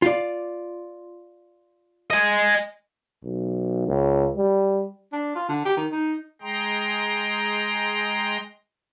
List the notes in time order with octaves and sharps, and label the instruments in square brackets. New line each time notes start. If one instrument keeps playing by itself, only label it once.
[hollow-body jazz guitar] F4 D5
[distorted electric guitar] D#5 G#5
[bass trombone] B1
C#2
G3
[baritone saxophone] D4
F4
D3
G4
D#3
D#4
[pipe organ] G#3 G#4 G5 A#5 C6